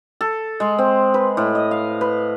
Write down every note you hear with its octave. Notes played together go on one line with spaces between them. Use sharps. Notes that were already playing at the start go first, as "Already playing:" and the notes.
A4
G#3
C4
B4
A2
D#5
F5
B4